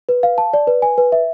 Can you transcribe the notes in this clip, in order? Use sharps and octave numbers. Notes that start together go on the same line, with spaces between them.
B4
F5
A5
D5
B4
G#5
B4
E5